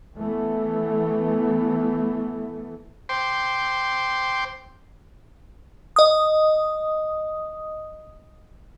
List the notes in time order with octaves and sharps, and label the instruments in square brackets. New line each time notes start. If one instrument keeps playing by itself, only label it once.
[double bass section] E3 A3 B3
[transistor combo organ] C5 G5 C6 D6
[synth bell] D#5 D#6